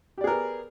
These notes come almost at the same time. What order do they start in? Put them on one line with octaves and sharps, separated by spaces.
G4 D5 G#4 A#4 B3